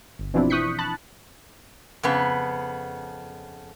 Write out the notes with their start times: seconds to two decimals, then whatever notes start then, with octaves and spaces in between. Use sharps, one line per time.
0.19 G1
0.34 B2 E3 F3 C4 D4 E4
0.50 C#6 D#6 F#6 G6 B6 C#7
0.79 A5 B5 F#6 A6
2.03 F2 C#3 B3